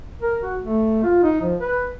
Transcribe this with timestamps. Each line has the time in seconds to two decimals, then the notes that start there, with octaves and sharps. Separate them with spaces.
0.22 A#4
0.42 F#4
0.61 A3
1.03 F4
1.23 D#4
1.41 F3
1.60 B4